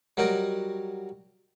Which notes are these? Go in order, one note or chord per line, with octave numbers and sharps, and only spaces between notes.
F#3 G3 F#4 A#4 D#5 G5